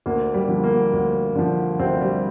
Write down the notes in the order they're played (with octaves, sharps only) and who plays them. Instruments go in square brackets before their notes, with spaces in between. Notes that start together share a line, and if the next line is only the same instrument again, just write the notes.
[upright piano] D2 A#3
G3
D3 F3
A#3
D2
D3 F3
D2 C3 C4
G3